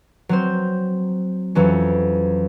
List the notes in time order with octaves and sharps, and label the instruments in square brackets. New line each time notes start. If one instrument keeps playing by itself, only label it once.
[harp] F#3 C4 C5
F2 E3 F#3 C#4